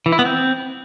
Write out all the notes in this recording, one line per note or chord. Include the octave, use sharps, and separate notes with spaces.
E3
E4
B3
C4